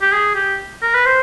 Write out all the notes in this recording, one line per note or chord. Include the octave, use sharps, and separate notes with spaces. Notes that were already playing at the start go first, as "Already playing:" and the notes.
G4
G#4
G4
A#4
B4
C5